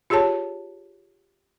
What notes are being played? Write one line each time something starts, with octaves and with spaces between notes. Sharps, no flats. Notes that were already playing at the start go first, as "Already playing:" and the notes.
F4 G4 G#4 C#5 A5